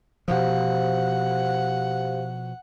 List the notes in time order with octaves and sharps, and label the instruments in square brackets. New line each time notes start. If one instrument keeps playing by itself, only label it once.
[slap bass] B2 F3 [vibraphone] G4 C5 F5 [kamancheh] F#5